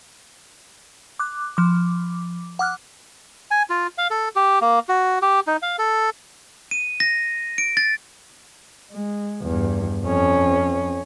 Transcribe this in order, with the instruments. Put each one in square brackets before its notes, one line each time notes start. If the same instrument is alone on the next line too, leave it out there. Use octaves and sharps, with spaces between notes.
[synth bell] D6 F#6
F3 D6
F#5 D6 F6 F#6
[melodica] G#5
F4
F5
A4
G4
A#3
F#4
G4
D#4
F5
A4
[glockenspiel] D#7
A#6
D7
A6
[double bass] G#3
E2 G2
F2 C#4